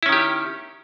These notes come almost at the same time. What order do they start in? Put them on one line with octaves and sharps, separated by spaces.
E4 C#4 D#3 G4